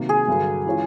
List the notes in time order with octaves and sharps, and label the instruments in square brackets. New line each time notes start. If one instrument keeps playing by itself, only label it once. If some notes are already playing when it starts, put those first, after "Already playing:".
Already playing: [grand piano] C3 D#3 F#3 A#3
[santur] G#4
[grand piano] G2 D3 F#3
E3 G#3 C#4 F4